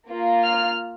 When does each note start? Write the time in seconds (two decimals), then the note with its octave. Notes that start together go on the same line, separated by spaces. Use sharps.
0.09 A#3 F4
0.43 F6